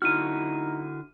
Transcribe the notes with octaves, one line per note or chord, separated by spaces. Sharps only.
D3 D#4 E4 F#4 F6 D#7